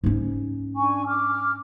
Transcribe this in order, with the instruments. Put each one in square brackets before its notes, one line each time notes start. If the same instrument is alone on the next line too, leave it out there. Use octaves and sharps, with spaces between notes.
[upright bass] G#2 C#4
[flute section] D4 G#5 C#6
D6 F6